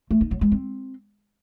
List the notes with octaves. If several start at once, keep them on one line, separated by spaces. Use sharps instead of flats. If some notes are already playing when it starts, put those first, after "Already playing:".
A3
D#4
F#3
G#3
C4